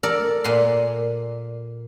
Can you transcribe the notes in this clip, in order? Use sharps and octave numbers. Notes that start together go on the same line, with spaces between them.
A4 A#4 D5
A#2 G#5 C6